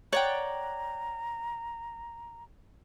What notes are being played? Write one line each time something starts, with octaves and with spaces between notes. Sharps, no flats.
C#5 D5 F#5 G5 A#5